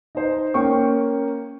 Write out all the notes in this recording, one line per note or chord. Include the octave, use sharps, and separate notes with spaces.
D#4 C5
A#3 C#4 G5 C#6